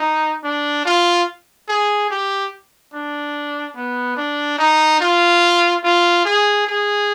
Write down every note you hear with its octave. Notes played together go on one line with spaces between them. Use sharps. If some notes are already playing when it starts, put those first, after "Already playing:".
Already playing: D#4
D4
F4
G#4
G4
D4
B3
D4
D#4
F4
F4
G#4
G#4